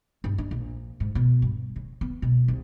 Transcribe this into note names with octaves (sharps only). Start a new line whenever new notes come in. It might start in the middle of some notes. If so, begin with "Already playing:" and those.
G2
D4
A#1
G#2
B2
G2
C#3
B3
B2
C2